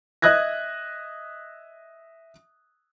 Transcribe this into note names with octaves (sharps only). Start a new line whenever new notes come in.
D#5 E5 D#6 F#6 G#6 A#6